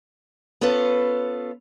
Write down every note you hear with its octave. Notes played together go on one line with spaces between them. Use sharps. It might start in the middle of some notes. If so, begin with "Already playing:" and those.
B3 C#4 F4 A4 B4